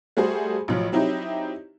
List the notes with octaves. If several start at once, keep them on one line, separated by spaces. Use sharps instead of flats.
G3 A3 F#4 G#4 C5
A1 F3 F#3
F#3 C4 D#4 E4 G4